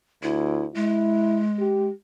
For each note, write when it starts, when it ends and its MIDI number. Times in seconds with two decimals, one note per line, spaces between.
0.23 0.68 38
0.23 0.66 64
0.75 1.89 56
0.75 1.41 64
1.59 1.91 67